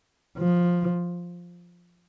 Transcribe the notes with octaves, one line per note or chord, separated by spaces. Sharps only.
F3